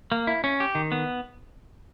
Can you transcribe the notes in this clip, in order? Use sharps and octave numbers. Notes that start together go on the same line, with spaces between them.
A#3
E4
C#4
G4
D#3
B3